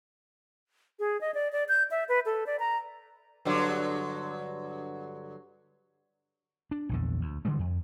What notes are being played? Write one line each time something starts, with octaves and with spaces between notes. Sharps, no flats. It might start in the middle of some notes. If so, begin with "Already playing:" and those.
G#4
D#5
D5
D5
G6
E5
B4
A4
D5
A#5
G2 D3 F#3
D4
A#1 E2 D3
D2
D3 E3 G3 G#3
F2